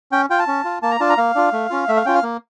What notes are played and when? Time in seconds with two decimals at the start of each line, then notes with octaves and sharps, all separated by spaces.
0.12 C#4 G5
0.30 F4 G5
0.39 A5
0.47 C#4
0.65 F4
0.82 A#3 A5
0.91 A#5
1.00 D4 F4 A5
1.10 A#5
1.18 A#3 F5
1.35 D4 F4
1.53 A3
1.70 C#4 F4
1.88 A3 E5
1.97 F5
2.06 C#4 F4 G5
2.15 F5
2.23 A#3